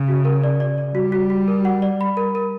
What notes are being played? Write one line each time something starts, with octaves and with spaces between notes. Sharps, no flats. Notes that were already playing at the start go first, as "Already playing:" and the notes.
Already playing: C#3
F#4
A#4
D5
D5
D5
G3 F#4
F#4
F#4
A#4
F#5
D5
B5
A#4
A#4